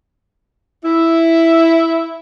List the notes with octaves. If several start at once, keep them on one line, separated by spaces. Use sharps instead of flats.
E4